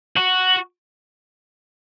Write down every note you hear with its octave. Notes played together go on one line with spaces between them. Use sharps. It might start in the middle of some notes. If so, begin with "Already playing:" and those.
F#4